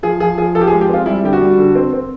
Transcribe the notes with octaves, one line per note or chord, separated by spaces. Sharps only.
F3 G#4
F3 G#4
F3 G#4
F3 A4
G4
G#4
G#3
G4
C4 F4
G3 E4
D3 G4
F#4
G3
D3
C4
C4